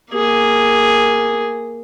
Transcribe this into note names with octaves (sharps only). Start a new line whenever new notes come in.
A#3 G#4